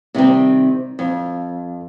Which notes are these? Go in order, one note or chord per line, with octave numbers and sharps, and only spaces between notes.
C3 D#3 G3 C4
F2